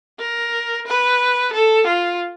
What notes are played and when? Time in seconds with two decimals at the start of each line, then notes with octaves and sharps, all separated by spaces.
0.19 A#4
0.87 B4
1.53 A4
1.87 F4